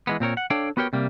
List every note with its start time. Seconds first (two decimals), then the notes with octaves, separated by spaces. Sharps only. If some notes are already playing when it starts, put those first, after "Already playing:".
0.07 E3 G#3 B3
0.20 A#2 C4 A#4 C#5
0.37 F#5
0.50 D4 A4 C#5 D5 F5 G5
0.77 B3 F#4 G4 A#4 C#5 G5
0.93 C3 G3 A#3